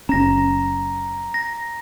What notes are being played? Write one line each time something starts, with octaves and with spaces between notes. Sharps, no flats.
F#1 C#4 A#5 A#6
A#6